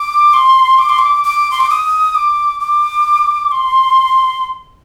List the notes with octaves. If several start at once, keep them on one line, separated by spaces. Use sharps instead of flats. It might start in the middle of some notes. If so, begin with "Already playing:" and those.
Already playing: D6
C6
D6
C6
D6
D6
C6
D6
D#6
D6
D6
C6